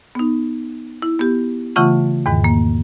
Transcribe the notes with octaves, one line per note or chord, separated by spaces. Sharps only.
B3 D#4
E4
B3 G4
C#3 E3 A3 F4 F#5 C#6
E2 G#2 D#3
A#3